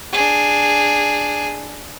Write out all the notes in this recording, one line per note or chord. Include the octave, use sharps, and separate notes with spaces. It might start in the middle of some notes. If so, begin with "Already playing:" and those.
D4 G#4